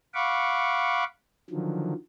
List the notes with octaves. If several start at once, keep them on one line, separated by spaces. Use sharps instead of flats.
F5 F#5 B5 C#6 D6
D3 D#3 F3 F#3